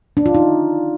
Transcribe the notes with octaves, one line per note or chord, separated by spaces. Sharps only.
D4
F4
D#4